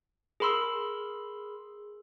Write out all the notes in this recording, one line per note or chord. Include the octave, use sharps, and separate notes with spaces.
G#4 A#4 B5 C6 E6